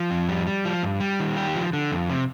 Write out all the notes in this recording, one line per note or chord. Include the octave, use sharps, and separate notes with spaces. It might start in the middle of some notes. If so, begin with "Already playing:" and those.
Already playing: F3
F2
G3
G3
F3
G2
G3
D#3
G4
F3
D3
F2
C3